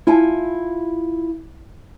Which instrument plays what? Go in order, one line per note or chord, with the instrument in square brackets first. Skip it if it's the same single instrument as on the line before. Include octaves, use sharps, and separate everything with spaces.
[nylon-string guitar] E4 F4 E5 G#5 A5